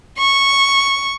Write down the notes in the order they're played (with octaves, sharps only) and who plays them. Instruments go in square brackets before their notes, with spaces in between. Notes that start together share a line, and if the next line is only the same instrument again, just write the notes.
[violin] C#6